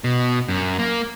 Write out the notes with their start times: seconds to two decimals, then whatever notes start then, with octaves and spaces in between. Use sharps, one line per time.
0.04 B2
0.48 F#2
0.79 A#3